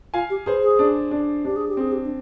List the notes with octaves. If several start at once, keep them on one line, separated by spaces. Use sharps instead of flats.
F4 F5 G#5
G4
G#4 B4 C5
G#4
D4
D4
D4 G4
G#4
G4
C4 G#4
G4
D4